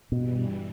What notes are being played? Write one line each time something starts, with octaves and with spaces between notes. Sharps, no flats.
G2 B2 E3 G3